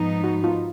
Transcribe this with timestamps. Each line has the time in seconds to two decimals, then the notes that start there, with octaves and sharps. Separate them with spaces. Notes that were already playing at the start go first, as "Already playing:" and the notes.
Already playing: G#2 F3 B3 D#4
0.24 F#4
0.44 F4